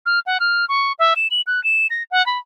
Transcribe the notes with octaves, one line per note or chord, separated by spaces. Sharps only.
F6
F#5
F6
C#6
E5
E7
F#7
F#6
E7
A#6
F#5
B5